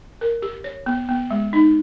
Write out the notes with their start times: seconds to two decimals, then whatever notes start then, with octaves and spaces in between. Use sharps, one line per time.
0.21 A#4
0.42 G4
0.64 C#5
0.86 B3
1.09 B3
1.31 G#3
1.53 D#4